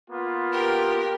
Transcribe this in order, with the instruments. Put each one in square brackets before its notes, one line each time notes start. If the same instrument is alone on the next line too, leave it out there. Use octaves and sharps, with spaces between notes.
[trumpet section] A#3 B3 F4
[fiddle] G4 A#4